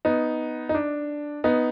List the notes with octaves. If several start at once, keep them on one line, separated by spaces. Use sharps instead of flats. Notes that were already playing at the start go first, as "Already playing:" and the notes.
B3 D#4
D#4
D4
B3 D#4